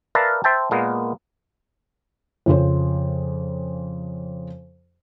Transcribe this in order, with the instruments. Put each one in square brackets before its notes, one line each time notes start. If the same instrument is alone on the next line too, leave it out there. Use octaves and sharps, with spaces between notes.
[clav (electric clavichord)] A#4 B4 D5 E5 F5 A5
C5 E5 G5 A5
A#2 G#3 A#3 B3
[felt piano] F2 C#3 F4 C5